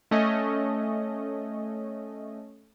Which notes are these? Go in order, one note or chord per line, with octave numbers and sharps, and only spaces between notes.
A3 C#4 D#5